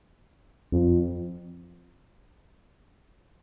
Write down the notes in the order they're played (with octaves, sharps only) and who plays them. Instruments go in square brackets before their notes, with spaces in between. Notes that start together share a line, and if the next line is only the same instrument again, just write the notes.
[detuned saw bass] F2